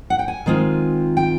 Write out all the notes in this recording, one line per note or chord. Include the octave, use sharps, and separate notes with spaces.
F#5
G5
G#5
D#3 G#3 C4 F4
G5